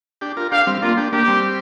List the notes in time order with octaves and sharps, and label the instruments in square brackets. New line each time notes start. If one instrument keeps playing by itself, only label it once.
[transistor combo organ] D4 G4
F4 A#4
[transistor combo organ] D4 G4 [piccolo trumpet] F5
[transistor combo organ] G3 C4
[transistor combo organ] A#3 D4 [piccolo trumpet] F4
[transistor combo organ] D4 G4
[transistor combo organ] A#3 D4 [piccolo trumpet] G4
[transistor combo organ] G3 C4